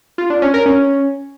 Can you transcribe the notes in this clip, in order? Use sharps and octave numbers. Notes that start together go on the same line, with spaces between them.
F4
D4
C#4
A#4
C#4